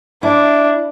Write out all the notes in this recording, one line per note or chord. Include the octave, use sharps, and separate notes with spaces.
D4 E4